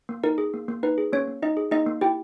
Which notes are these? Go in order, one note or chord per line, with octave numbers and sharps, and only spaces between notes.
A#3
D#4 A#4
G#4
A#3
A#3
D#4 B4
G#4
A#3 C#4 C#5
A#3
D#4 D#5
G#4
A#3 D#4 D#5
A#3
E4 G4 G5